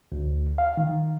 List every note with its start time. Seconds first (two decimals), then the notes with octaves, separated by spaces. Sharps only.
0.12 D2
0.58 F5
0.77 D#3